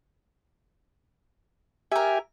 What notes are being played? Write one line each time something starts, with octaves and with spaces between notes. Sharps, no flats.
G4 A#4 E5 G#5